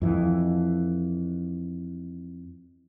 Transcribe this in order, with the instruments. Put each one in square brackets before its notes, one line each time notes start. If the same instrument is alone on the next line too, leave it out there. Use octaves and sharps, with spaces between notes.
[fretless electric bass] F2 E3